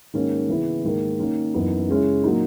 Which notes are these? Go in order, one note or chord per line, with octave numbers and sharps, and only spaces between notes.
G#2 D#3 A#3 C#4
C#3 E3 B3 E4
G#2 D#3 A#3
D#3 A#3 C#4
F#2 E3 B3 D#4
C#3 G#3 C#4 E4
A#2 F#3 A#3 D#4